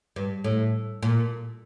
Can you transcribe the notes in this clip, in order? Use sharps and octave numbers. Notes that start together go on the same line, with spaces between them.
G2
A2
A#2